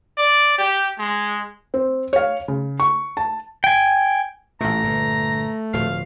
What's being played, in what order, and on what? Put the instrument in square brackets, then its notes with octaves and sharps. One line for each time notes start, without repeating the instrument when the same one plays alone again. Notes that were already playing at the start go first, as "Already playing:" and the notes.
[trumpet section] D5
G4
G#3
[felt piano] C4
C#5 F5
C#3
C#6
A5
[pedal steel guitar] G5 G#5
[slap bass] A1 A#2 [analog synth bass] A3 [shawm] A#5
[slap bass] G1 A#2
[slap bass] D1 B2 F3 [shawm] F5